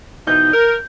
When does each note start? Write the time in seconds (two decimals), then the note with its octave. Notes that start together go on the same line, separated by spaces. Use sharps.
0.27 B2 E3 D#4 G6
0.53 A#4